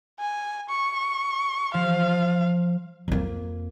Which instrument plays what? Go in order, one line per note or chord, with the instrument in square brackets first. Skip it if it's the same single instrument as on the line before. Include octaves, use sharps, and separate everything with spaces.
[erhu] G#5
C#6
[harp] F3 [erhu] F5
[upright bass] F2 A#3